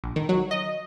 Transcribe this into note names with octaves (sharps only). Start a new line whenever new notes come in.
A#1
D#3
F#3
D#5